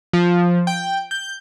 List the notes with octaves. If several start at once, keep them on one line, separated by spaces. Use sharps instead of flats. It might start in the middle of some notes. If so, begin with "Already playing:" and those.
F3
G5
G6